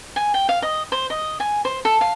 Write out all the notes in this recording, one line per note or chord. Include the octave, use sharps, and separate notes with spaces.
G#5
G5
F5
D#5
C5
D#5
G#5
C5
A4
F5